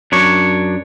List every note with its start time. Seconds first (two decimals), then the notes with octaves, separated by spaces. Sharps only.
0.12 F#2 D4 C#5